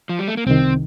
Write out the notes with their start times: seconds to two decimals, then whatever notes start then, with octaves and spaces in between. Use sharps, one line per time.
0.09 F3
0.19 G3
0.28 A3
0.37 A#3
0.46 C2 C3 D#3 C4